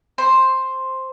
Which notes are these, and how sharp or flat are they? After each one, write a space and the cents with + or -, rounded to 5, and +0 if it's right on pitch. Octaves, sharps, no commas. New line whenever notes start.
C5 +5